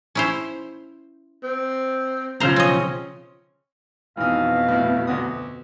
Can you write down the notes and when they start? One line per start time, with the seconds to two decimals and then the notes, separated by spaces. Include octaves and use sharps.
0.15 C#4 E4 C5
1.43 C4
2.40 B1 C#3 F3 C5 A#5
2.56 C4 C#4 D#5
4.17 F2 B2 E3 D#4 F5
4.69 A2 E4
5.07 D2 F#4 D#6